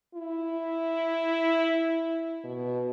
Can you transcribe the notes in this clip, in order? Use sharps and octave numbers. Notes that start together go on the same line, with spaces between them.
E4
B2